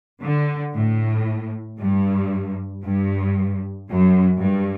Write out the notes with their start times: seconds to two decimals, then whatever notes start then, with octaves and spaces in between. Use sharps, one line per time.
0.21 D3
0.74 A2
1.79 G2
2.84 G2
3.88 F#2
4.40 G2